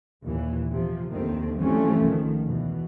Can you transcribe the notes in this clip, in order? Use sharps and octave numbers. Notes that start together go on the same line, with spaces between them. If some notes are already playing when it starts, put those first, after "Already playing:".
D#2 A#2 E3
C3 F3
D#2 D3 D#3 A3 C4
E3 F3 G3 A3 C4 C#4
C#2 D#3 F3
E2 B2